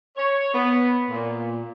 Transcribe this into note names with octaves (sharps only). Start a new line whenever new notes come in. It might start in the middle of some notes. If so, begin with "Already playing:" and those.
C#5
B3
A#2